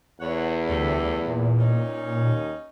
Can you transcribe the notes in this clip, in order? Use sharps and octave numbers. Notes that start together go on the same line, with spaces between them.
E2 C#5 F#5
D2 G3 A3
A#2
C#4 D#4
D#2